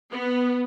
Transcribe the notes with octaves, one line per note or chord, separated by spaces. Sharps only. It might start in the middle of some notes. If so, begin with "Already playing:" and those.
B3